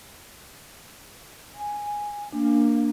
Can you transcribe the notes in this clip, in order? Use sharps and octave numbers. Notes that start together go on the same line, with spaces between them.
G#5
A#3 D4